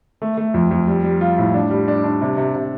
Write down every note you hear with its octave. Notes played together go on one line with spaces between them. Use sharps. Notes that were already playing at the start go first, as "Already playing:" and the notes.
A3
A3
F2
F2
G3
G3
F4
A2
D4
G3
D4
D4
C3
C3
C3